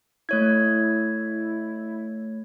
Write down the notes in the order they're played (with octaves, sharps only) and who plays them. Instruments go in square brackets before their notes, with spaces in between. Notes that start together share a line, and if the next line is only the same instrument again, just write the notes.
[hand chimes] A3 C#5 G#6 [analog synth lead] E4